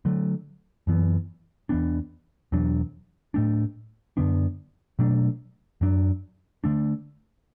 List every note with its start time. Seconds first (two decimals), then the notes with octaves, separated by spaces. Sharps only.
0.05 D3 F#3 A3
0.87 F#2 E3 B3
1.69 E2 E3 B3 D4
2.52 E2 B2 F#3 D4
3.34 A2 A3 D4
4.17 F#2 D3 B3 D4
4.99 B2 F#3 A3 D4
5.81 F#2 F#3 D4
6.64 D3 A3 D4